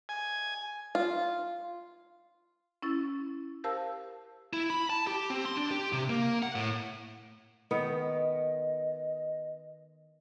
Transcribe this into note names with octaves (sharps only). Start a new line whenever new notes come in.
G#5
F4
C#4 E4 A6
G4 A#4 C5 F5 A5 E6
E4
B5
A5
G4
C4
C6
D4
G4
C3
A#3
F#5
A2
D#3 B3 D#5